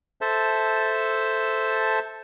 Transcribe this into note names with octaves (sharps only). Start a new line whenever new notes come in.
A4 C5 E5 A5